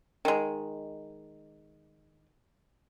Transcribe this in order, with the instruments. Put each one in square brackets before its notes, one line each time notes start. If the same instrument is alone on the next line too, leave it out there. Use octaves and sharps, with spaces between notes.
[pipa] D#3 G#3